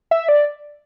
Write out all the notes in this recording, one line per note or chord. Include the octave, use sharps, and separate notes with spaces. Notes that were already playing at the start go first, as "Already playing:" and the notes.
E5
D5